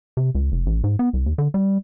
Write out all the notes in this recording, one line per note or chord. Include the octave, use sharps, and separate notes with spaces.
C3
C#2
F1
A1
G#2
B3
C2
D#2
D3
G3